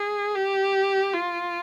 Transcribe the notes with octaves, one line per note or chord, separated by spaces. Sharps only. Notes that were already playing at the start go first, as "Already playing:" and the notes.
Already playing: G#4
G4
F4